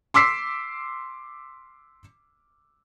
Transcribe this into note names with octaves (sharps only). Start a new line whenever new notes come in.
C6 D6 E6 B6 C7